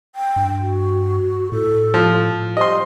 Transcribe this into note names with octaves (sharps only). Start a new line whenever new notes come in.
G5
G2
F#4
A2 A4
F3
G3 C5 D#5 C6